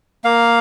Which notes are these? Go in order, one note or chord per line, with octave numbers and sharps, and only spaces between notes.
A#3 F5